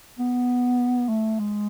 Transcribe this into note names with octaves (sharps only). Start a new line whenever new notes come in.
B3
A3
G#3